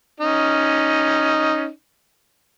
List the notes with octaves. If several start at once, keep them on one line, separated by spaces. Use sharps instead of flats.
C#4 D#4